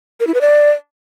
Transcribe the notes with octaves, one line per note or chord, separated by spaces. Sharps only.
A#4
E4
B4
D5